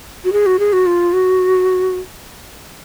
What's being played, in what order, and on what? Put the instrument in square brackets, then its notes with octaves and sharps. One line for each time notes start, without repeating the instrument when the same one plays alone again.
[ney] F#4
G#4
F#4
G#4
F#4
F4
F#4